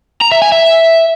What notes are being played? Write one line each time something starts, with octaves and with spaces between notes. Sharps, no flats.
A#5
E5
G#5
E5